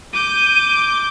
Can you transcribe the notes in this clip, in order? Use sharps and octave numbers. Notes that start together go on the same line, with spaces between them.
D6 G6 D#7